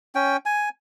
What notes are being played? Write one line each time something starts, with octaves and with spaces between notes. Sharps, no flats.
C#4 G5
G#5